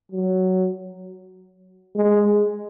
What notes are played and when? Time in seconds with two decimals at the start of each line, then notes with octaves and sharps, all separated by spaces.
0.11 F#3
1.95 G#3